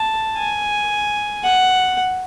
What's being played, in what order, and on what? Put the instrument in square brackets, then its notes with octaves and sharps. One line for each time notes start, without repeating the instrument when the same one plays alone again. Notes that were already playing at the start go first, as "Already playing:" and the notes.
Already playing: [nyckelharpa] A5
G#5
F#5